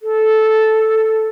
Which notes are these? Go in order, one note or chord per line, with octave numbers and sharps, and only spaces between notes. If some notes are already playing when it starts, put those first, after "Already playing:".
A4